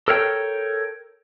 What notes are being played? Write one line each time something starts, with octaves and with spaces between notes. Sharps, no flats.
A4 A#4 C#5 F5 G5